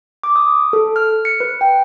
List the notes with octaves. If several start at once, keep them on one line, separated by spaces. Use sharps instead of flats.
D6
D#6
A4
F6
C#7
B4
G5